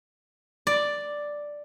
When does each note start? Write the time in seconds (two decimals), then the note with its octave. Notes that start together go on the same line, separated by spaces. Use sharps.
0.67 D5